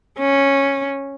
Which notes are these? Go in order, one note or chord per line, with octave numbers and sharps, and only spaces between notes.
C#4